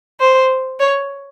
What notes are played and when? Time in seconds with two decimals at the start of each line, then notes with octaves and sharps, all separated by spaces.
0.20 C5
0.80 C#5